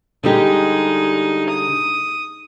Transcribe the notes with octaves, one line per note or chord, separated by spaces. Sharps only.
D3 G3 G#3 D#4 G4
D#6